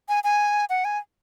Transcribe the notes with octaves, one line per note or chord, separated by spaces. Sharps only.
G#5
G#5
F#5
G#5